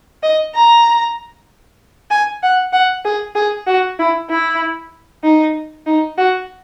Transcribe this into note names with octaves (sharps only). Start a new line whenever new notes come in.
D#5
A#5
G#5
F#5
F#5
G#4
G#4
F#4
E4
E4
D#4
D#4
F#4